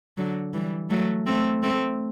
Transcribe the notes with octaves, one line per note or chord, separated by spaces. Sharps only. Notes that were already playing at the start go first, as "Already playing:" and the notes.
D3 F#3
E3 G3
F#3 A3
A3 C4
A3 C4